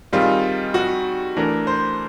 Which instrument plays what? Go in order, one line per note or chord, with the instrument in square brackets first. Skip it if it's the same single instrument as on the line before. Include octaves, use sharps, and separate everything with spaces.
[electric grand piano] D#3 G3 C4 D#4 G#4 [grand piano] F4
[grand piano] F#4
[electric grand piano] E3 A3 D4 [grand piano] A#4
[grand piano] C5